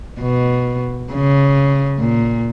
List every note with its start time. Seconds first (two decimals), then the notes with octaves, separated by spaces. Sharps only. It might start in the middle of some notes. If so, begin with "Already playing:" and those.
0.21 B2
1.12 C#3
1.99 A#2